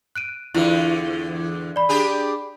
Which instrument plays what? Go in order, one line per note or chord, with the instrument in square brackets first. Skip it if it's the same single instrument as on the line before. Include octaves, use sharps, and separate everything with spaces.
[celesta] F#6 D7 D#7
[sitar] E2 D3 [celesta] E4 F4
[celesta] D5 B5
[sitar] D4 G4 G#4